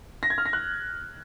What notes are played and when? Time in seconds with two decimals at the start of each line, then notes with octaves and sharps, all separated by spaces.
0.23 A#6
0.30 G#6
0.38 F6
0.46 A#6
0.53 F#6